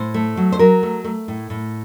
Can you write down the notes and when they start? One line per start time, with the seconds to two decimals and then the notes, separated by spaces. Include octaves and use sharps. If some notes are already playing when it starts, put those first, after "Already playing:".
Already playing: A2 C5
0.14 A3
0.37 F#3
0.52 C5
0.59 F#3 A#4
0.83 A3
1.04 A3
1.28 A2
1.50 A2